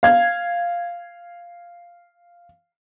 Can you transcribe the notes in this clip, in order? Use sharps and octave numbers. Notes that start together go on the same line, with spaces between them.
F5 G#6